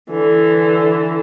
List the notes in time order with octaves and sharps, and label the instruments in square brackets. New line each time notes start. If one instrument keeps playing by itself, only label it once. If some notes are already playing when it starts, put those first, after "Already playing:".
[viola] D3 E3